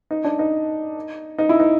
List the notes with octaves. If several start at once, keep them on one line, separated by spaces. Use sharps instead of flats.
D#4
D4
D#4
D#4
E4
D#4